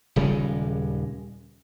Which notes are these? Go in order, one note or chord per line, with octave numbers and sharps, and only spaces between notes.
D#1 C#3 G3 G#3